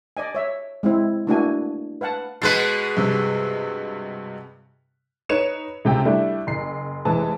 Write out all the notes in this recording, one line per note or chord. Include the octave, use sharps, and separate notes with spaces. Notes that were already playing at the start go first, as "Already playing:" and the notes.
D5 D#5 G#5
C#5 E5
G#3 C4 E4
A3 A#3 D4 E4 F#4 G#5
B4 F5 F#5 A5
B2 G#3 B4 F#6 A6 C7
G2 C3
D#4 B4 C#5 C#7 E7 F7
C#2 C3 G5
G3 A3 D4 E4 E5
F#1 C7
F1 E3 G#3 A5